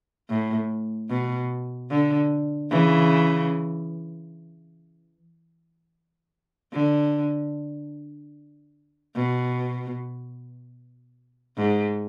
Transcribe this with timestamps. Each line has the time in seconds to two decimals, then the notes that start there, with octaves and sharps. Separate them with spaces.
0.29 A2
1.09 B2
1.90 D3
2.70 C#3 E3
6.73 D3
9.16 B2
11.57 G#2